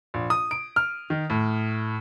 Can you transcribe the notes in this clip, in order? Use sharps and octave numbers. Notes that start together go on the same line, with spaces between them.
A#1
D#6
D7
F6
D#3
A2